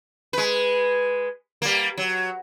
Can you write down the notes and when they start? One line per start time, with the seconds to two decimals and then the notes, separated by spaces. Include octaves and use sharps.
0.33 G#3 B4
1.62 G3 A#3
1.97 F#3